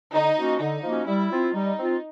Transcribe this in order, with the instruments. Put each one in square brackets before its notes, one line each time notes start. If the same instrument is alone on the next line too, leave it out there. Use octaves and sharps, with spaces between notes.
[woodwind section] D3 [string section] D#4
[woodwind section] F3 A#3 C#4 F#4
[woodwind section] D3 [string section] D#4
[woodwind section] F3 A#3 C#4 F#4
[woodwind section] G3 [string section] E4
[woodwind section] C4 F4
[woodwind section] G3 [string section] D#4
[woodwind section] C4 F4